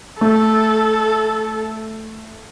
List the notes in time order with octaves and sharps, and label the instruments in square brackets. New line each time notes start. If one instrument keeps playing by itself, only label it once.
[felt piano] A3 [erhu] A4